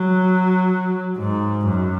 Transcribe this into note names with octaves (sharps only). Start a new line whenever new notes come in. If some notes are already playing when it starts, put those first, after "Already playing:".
Already playing: F#3
G#2
F#2